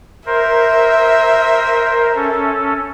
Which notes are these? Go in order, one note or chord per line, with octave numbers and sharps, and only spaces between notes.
A#4 C5 E5
C#4 A4